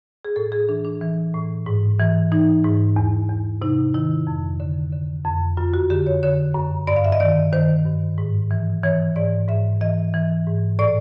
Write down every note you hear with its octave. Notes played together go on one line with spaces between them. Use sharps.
G#4
A2 A4
G#4
E3 D4
D4
E3
A2
G#2
E3
E3 D#4
G#2
E2
E2
C3 D#4
D#3 E4
F2
D3
D3
F2
F#2 F4
F#4
D3 G4
C#5
D3 C#5
F#2
G2 D5
F5
E5
D#5
D#3 D5
D#3 C5
G2
G#2
E3
E3 C#5
G#2 D5
G#2 E5
E3 D#5
E3
G#2
A2 D5